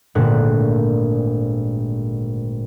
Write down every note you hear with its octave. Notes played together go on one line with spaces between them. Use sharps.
G#1 A#2 D3 A3 F#6